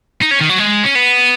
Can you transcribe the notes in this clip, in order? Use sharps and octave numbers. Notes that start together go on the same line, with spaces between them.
D#4
C#4
D#3
F#3
G#3
C#4
B3